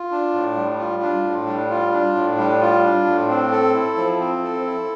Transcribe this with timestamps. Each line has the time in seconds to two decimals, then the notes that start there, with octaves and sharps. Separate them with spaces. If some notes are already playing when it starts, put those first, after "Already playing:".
Already playing: F4
0.11 D4
0.33 A2
0.57 G3
0.79 F4
1.02 D4
1.24 A2
1.47 G3
1.71 F4
1.92 D4
2.16 A2
2.38 G3
2.61 F4
2.84 D4
3.06 A2
3.29 C4
3.52 A4
3.74 E4
3.97 F3
4.20 C4
4.43 A4
4.65 E4